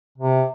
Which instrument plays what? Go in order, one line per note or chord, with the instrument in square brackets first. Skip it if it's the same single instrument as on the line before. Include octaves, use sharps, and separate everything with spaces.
[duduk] C3